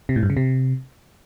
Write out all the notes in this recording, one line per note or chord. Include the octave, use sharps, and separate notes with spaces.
C3
A2
G2
C#3
C3